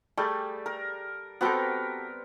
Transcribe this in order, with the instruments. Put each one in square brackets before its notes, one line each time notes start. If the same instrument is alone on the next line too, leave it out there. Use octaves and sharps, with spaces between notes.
[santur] G3 A3 [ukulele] G4 G#4
[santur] A#4
[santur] B3 C4 A#4 [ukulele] F#4 G4 A4